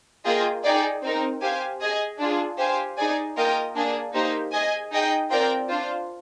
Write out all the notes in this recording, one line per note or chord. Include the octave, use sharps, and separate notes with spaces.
A#3 F4 G#4 D#5 G5
D#4 G#4 D5 G5
C4 D#4 A#4
G4 C5 F5 G#5
G#4 D#5 G#5
D4 F4 G#4
G4 C5 F5 G#5
D#4 G#4 D5 G#5
A#3 F4 A#4 D#5 G5
A#3 D4 G#4
A#3 D#4 G4 C5
G#4 D#5 G#5
D#4 G#4 D#5 G5
C4 F4 A#4 D5 G5
D4 F4 C5